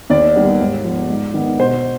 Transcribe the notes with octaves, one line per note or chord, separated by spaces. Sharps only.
D#2 D5
D#3 G3 B3
G#2
F3 B3
G#2
D#3 B3
B2 C5